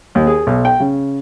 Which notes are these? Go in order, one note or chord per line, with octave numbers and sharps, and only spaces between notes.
D#2
G#4
B1
G5
C#3